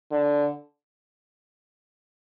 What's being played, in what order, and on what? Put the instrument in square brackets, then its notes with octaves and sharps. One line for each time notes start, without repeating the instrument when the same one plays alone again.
[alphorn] D3